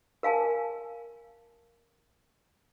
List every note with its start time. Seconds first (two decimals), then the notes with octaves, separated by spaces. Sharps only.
0.23 A#4 F5 G#5 A5